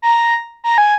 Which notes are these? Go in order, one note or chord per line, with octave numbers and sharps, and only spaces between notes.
A#5
A#5
G#5